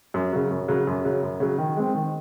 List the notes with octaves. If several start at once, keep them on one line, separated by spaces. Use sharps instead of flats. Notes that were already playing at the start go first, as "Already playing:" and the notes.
F#2
C#3 F#3
F#2
C#3 F#3
F#2
C#3 F#3
F#2
C#3 F#3
D#3
G#3 C4
D#3